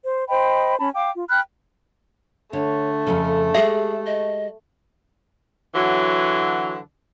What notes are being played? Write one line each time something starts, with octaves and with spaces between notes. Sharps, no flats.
C5
C5 D#5 G5 B5
C#4 A5 B5
F5 G5 D6
F4
G5 B5 F6 F#6
D3 A3 C#5
F2 G#2 C#3 A4
G#3 G4 G#4 E5
D#5
D3 E3 F#3